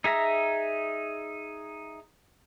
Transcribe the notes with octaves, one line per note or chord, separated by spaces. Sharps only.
D#4 G#4 E5 A#5